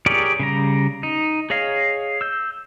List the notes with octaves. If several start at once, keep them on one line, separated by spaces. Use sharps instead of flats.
G4 G#4 A#4 C#5 D5
C#3 G3 A#5
D#4
G#4 C#5 D#5 F5
E6 G6